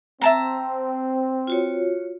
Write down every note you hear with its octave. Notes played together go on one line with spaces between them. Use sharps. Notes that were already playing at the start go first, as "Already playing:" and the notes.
C4 E5 A5 A#5
F4 F#4 C#5